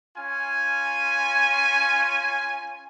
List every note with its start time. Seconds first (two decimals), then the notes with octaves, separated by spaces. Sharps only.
0.17 C#4 F4 G#5